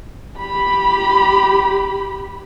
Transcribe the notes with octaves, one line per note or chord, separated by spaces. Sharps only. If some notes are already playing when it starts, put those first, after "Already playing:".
G4 B5